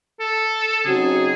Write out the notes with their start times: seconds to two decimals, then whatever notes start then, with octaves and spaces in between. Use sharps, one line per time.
0.20 A4
0.85 C#3 F#3 C4 D#4 F#4 G#4